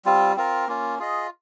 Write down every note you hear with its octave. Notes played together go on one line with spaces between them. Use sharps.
G3 C4 F4
C4 F4 A#4
A#3 C#4 F4
F4 G#4 D#5